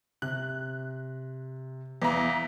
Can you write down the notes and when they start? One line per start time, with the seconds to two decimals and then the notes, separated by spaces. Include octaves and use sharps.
0.22 C3 F#6
2.02 E2 B4 E5 F5 A#5